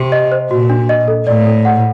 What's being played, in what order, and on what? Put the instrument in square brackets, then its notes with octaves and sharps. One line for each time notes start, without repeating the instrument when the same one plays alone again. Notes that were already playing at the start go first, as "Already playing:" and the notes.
Already playing: [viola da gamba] C3 [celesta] G4
[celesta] D#5
C5
[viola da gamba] A#2 [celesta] F#4
[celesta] D4
D#5
A4
[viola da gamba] A2 [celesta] D5
[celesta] A4
F#5